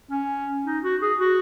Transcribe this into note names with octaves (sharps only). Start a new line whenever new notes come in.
C#4
D#4
F#4
G#4
F#4